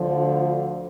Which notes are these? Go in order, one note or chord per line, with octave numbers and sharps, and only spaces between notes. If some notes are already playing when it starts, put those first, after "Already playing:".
Already playing: D2 D3 F3